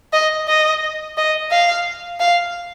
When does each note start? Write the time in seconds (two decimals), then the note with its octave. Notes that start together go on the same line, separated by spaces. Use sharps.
0.13 D#5
0.48 D#5
1.17 D#5
1.51 F5
2.20 F5